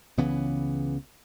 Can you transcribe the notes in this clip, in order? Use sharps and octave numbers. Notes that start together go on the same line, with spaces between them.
C#2 C#3 E3 B3